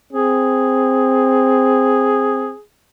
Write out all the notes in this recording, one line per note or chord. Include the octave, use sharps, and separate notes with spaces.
C4 G#4